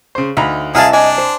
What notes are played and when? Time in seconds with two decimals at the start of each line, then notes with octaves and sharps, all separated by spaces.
0.15 C#3 C5
0.37 D2 D#4 E5 F5 A#5 B5
0.75 C2 E4 G#4 D#5 F5 F#5 A5 F6
0.93 D4 D#5 G#5
1.18 C5